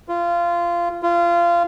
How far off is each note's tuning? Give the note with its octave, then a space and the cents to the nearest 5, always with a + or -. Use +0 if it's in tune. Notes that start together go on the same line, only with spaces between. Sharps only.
F4 -20
F4 -25